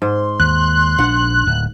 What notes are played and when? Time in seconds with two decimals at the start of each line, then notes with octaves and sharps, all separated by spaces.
0.02 G#2 C6
0.40 D#2 F#6
0.98 A#1 D4 F#5
1.47 D1